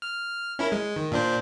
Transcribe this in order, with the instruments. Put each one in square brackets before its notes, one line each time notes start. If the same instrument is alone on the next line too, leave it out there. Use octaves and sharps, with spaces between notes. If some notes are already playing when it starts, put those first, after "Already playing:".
[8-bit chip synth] F6
C#4 E4 A#4
G#3
D#3
A#2 D4 C5